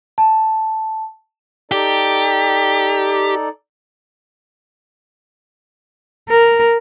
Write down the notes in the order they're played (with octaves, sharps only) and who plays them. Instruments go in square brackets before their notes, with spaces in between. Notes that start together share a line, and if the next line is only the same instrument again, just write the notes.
[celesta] A5
[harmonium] D#4 A4 D5 [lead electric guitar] G4
[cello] A#4